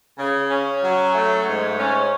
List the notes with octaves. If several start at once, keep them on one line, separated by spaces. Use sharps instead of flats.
C#3
C#4
F#3
A3
G#2
C#4